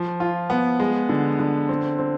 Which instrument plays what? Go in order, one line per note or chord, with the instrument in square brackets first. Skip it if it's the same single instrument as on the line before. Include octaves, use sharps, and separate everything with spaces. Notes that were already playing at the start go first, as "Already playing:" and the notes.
Already playing: [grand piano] F3
F4
B3
G#3
D3
D3
C4
C4